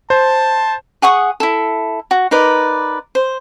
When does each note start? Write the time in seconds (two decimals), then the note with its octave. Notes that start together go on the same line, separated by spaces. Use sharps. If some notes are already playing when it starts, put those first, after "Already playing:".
0.10 C5 A5
1.02 G#4 F#5 C#6 D#6
1.40 E4 A4
2.11 F#4
2.31 D#4 A#4 B4 D5
3.15 C5